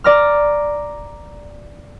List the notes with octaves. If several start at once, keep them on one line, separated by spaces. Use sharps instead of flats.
D5 A#5 F6